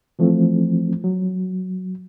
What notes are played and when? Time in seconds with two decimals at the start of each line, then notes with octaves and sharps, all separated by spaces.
0.19 E3 F3 A3 C4
1.04 F#3